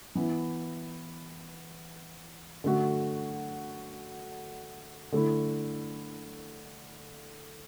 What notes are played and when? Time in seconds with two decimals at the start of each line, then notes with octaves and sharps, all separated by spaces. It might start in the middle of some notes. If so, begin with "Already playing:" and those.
0.15 E3 B3 E4
2.64 D3 A3 F#4
5.12 D3 A3 E4